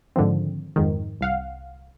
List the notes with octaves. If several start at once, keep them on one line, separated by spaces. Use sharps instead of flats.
G#2 D3 D#3 F3 C4
F2 G#2 D#3
C2 F5 F#5